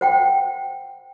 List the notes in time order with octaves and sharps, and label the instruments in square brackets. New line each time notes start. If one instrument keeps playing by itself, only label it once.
[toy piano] C5 F#5 G5